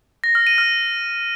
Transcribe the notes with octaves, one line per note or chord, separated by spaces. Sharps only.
A#6
F6
D#7
F6